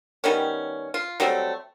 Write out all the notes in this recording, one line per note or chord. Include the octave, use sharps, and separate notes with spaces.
D#3 G3 B3 C#4
F4
F#3 G3 A3 C4